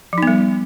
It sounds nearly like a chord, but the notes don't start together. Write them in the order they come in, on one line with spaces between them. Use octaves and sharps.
F3 D#4 B3 G3